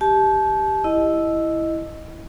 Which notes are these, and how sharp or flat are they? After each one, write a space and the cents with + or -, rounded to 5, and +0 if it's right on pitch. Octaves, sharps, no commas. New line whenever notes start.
G4 +0 A5 -30
E4 +0 D#5 +0